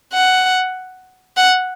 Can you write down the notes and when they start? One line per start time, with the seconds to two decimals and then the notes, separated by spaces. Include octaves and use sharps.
0.14 F#5
1.37 F#5